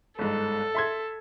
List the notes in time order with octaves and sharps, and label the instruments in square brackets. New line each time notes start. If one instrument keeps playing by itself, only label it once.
[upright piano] G1 G#2 [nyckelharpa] A4
[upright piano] E5 C6 G#6